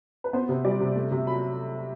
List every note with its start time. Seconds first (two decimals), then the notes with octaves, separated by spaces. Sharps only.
0.24 B4
0.33 B3 C5
0.49 C3 C5
0.64 G3 D5
0.80 C3
0.96 A3
1.11 C3
1.27 F#3 B5